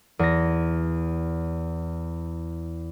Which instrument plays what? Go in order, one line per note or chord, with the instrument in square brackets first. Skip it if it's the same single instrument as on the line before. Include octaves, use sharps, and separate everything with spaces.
[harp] E2 A#6